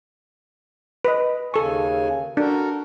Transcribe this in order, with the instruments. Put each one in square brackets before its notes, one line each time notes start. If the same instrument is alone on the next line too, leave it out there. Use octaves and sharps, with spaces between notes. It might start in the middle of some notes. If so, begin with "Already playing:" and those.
[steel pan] B4 D#5
[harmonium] D#2 C#3 G#5 [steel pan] A4 C#6
[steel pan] D4 [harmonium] F#4 A4 A#4